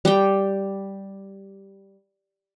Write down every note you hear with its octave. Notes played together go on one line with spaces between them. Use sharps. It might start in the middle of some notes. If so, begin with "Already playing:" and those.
G3 G5